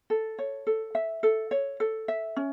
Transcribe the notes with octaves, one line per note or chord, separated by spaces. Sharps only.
A4
C#5
A4
E5
A4
C#5
A4
E5
C#4